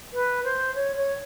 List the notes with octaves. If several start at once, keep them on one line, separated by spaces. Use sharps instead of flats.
B4
C5
C#5
C#5